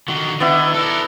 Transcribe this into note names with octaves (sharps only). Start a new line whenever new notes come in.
D3 D#3 F#4
D#3 B3 D4 E4
A4 A#4